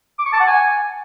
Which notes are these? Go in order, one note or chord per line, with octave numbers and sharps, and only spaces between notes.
D6
C#6
A5
F#5
G#5